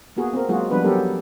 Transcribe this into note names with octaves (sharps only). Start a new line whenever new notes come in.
A#3 B3 F#4 G#4
C4 A#4
F#3 G#3 A#3 F4 F#4 G#4
F3 G3 B3 D4 B4
F#3 B3 C#4 G4 A4 A#4
F#3